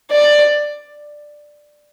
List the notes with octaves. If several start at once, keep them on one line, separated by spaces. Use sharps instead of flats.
D5